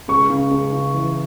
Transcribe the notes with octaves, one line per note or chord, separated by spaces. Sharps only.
C#2 C#6
C#3
C#2
C#3
E3